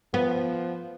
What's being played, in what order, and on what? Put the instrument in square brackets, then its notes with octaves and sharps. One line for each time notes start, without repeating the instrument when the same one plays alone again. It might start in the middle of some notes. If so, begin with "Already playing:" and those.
[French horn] F3 [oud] B3